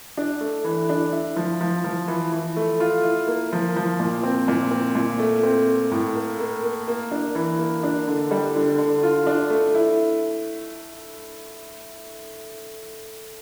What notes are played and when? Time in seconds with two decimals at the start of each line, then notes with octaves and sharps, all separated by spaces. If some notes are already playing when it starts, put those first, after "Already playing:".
0.17 D4
0.41 A3
0.64 E3
0.89 D4
1.12 E4
1.37 F3
1.61 F3
1.84 F3
2.08 E3
2.32 E3
2.56 A3
2.80 F4
3.04 E4
3.28 A#3
3.53 F3
3.76 F3
4.00 A#2
4.23 C4
4.48 A#2
4.71 C4
4.95 A#2
5.19 A3
5.43 C4
5.67 A3
5.92 A2
6.15 A#3
6.40 A#3
6.64 A#3
6.88 A#3
7.11 D4
7.35 E3
7.59 A#3
7.83 D4
8.08 D3
8.31 G3
8.56 D3
8.78 D3
9.03 F4
9.26 D4
9.50 A3
9.75 E4